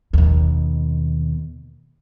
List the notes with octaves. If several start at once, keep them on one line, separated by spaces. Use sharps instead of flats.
D#2 B2